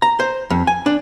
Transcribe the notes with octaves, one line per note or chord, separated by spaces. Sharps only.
A#5
C5
F2
G#5
D4